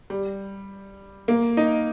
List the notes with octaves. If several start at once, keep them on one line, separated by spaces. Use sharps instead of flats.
G3
A#3
D#4